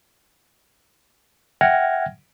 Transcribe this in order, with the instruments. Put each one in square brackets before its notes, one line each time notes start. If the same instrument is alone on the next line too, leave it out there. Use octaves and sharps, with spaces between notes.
[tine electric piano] E5 F#5 G5 F6 G#6 A#6